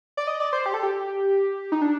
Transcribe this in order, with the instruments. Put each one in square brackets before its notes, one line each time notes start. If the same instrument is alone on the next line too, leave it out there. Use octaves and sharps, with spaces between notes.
[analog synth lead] D5
D#5
D5
C5
G4
A4
G4
D#4
D4